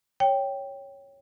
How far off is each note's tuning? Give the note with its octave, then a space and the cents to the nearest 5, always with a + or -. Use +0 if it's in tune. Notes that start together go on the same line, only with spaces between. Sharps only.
C#5 +0 G5 +0